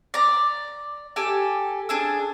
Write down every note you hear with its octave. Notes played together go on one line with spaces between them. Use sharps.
D5 A#5
G4 A4 G#5
D4 G#4 E6